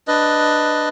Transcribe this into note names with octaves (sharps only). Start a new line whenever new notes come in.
D4 B4 D#5